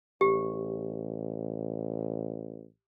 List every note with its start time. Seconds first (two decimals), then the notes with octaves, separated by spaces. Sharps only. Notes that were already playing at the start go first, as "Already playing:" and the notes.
0.21 A1 G4